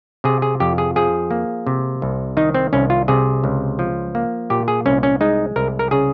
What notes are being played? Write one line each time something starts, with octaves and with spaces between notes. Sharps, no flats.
C3 G#4
G#4
F2 G4
G#4
F3 G#4
A#3
C3
C2
D#3 D#4
C4
C2 C#4
F4
C3 G#4
C#2
F3
A#3
A#2 G4
G#4
C2 C#4
C#4
G#3 D#4
C2 A#4
A#4
C#3 G#4